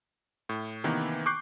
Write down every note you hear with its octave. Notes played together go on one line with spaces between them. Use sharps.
A2
C3 D#3 E3 A#3 B3
C#6 D6 F#6 G6 C7